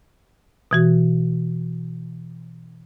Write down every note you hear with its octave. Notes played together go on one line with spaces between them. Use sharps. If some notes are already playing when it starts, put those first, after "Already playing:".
B2 E3 F#4